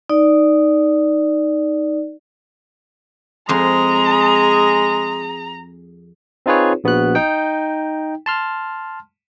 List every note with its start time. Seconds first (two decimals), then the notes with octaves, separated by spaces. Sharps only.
0.09 D#4 D5
3.49 F2 G#3 G#4 A#5 C6
6.46 C4 D#4 F4 G#4 B4 C#5
6.84 A#1 B3 F#4 F#6
7.15 D#4 G5
8.26 A5 C6 F6